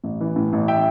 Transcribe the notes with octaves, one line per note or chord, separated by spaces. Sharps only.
A1
E3
A2
A1
E5 G5